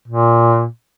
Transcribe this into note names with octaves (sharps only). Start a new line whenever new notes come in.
A#2